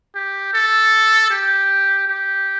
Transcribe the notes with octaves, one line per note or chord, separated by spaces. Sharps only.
G4
A4
G4
G4